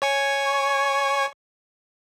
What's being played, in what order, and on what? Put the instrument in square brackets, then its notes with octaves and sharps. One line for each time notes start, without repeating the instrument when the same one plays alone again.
[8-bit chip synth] C#5 G#5 C#6